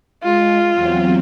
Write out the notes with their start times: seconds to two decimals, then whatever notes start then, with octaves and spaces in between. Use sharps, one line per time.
0.23 G#3 F4
0.71 E2 F#3 C4